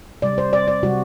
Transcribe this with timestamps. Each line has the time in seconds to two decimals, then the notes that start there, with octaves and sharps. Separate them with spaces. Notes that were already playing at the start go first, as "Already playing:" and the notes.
0.22 C3 G3 D5
0.38 C5
0.53 D5
0.68 D5
0.83 C3 G3 F#4